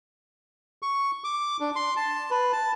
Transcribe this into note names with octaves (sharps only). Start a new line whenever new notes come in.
C#6
D6
D4
C6
A5
B4
A5